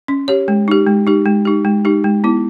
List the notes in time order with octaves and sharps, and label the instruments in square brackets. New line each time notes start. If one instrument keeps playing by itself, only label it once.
[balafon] C#4
G4 C#5
G#3
D#4 G4
G#3
D#4 G4
G#3
D#4 G4
G#3
D#4 G4
G#3
B3 E4